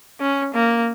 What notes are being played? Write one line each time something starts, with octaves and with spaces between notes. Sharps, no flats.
C#4
A#3